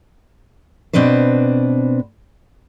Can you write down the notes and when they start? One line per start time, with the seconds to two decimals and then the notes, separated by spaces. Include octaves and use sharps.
0.93 B2 C4 D4 B4 C5